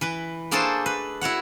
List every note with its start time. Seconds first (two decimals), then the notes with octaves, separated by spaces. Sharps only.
0.01 E3 B4
0.51 A3 A#3 D4 G#4 A4 C5
0.86 B4
1.21 E4 F#4 C#5 F#5